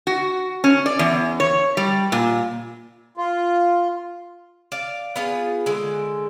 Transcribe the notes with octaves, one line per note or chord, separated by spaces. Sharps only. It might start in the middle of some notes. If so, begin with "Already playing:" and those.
F#4
C#4
D5
E2
C#5
G3
A#2
F4
D5 F5
B3 F4 G#4
D3 G#3